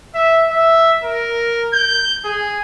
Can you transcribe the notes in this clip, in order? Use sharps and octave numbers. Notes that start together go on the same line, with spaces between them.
E5
E5
A#4
G6
G#4